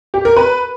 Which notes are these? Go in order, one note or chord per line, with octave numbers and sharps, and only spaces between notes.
G4
A#4
B4